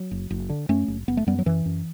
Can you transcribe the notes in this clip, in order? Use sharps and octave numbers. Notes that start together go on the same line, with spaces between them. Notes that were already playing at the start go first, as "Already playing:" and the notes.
Already playing: F#3
F#1
F#1
D3
F#2 A3 C#4
F#1
F#1 B3
A3
F#2 G3 B3
F#3
F#2 E3
F#2